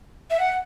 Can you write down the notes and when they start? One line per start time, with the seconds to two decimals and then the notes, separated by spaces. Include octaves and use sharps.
0.31 E5
0.40 F#5